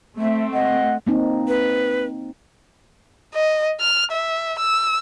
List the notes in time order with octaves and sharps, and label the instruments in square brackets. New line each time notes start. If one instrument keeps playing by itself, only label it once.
[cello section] A3 C4 [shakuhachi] E5
[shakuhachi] D#5 [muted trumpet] F#5
[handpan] A#3 C4 D#4
[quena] B4
[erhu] D#5
F6
E5
E6